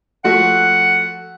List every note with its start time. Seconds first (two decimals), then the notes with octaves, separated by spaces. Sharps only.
0.24 F3 A3 F#4 F#5